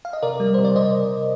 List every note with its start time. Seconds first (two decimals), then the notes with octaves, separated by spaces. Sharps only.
0.05 F5
0.13 D#5
0.23 C3 A#4 D5
0.40 G3
0.54 C3 C5
0.65 D5
0.76 C3 C5 D#5